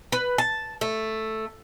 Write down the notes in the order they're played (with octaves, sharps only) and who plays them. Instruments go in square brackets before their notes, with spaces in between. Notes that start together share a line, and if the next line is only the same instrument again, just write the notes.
[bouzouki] B4
A5
A3